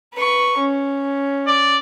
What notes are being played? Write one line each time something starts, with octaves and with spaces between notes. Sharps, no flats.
B4 C#6
C#4
D5